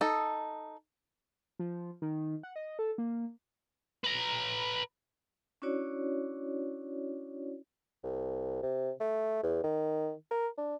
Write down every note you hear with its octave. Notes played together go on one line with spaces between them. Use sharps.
D#4 A4
F3
D#3
F#5
D#5
A4
A#3
B4 A#5
C#4 D4 E4 F#4 C#5 D5
C2
C3
A3
E2
D#3
A#4
D4